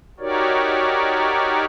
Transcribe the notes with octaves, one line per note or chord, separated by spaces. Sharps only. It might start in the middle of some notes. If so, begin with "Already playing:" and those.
D#4 F#4 G4 A#4 C#5 D5